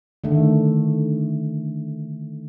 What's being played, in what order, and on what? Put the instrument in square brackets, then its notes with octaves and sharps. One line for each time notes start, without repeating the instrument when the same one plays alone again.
[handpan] D3 D#3 A3